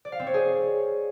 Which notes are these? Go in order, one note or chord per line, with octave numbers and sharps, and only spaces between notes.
D5
F5
C4
C#5
G#4